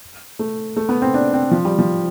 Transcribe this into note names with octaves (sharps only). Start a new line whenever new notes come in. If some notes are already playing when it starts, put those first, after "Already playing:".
A3
A3
B3
C4
D4
C4
F3
G3
F3